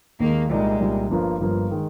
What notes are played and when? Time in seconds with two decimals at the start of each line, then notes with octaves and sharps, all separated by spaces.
0.19 D#2 D#3 G#3 A#3
0.50 C2 A#2 G3 G#3 A#3 D#4
0.80 C2 A#2 G3 A#3 D#4
1.10 G1 G2 F3 A#3
1.40 G1 G2 F3 A#3
1.71 D#3 G#3